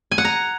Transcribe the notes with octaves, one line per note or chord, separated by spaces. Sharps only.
G#5
F#5
A#5